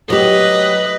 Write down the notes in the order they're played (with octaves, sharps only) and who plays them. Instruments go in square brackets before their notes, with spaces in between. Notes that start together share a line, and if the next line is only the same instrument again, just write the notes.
[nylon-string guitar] F#3 G4 [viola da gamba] B4 D#5